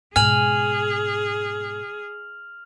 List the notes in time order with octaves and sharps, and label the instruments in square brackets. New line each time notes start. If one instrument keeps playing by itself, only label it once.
[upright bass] G#2 B2 [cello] G#4 [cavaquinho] G#5 [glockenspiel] F6 F7 F#7